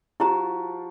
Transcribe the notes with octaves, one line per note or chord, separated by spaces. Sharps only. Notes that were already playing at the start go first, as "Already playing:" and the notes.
F3 E4 F#4 G4 A#5